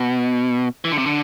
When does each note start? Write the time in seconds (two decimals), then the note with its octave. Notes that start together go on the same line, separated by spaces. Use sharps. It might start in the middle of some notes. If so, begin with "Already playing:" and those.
Already playing: B2
0.85 E3
0.92 D3
0.98 C3
1.06 D3